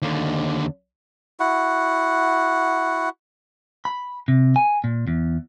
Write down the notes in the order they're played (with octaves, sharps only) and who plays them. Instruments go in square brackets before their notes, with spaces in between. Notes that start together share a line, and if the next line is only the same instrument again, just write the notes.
[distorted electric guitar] D#2 D3
[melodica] E4 F#4 F#5
[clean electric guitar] B5
C3
G#5
A#2
E2